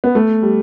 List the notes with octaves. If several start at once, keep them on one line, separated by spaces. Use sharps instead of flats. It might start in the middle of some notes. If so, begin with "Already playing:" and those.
B3
A3
G3